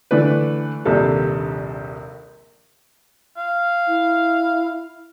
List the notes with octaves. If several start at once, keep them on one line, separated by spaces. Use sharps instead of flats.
D3 E3 A3 D4 B4
A#1 D#2 C3 G3 D4 A4
F5
E4